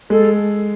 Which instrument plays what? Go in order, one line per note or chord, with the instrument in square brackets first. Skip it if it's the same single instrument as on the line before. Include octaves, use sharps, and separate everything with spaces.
[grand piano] G#3 [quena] A4